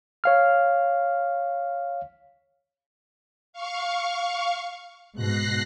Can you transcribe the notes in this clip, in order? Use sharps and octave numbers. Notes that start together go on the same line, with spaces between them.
C#5 F5 F6
F5 C#6
G#2 B2 F#6 A#6 C7